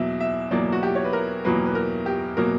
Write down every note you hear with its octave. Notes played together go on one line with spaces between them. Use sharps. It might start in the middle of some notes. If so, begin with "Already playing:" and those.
Already playing: E2 B2 F#3 A#3 E5
E5
E2 B2 F#3 A#3 D5
F#4
G4
C#5
B4
A#4
E2 B2 F#3 A#3 B4
B4
A#4
G4
B2 F#3 A#3 A#4